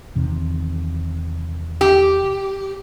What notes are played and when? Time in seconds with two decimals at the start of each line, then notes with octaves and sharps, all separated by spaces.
0.15 E2 C3 D#3
1.81 G4